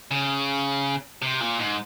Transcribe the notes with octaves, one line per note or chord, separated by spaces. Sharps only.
C#3
C3
A#2
G#2